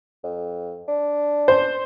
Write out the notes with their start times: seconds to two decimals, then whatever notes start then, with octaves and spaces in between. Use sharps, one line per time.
0.24 F2
0.88 D4
1.48 C5